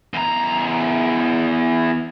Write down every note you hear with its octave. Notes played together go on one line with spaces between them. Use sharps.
E2 A#5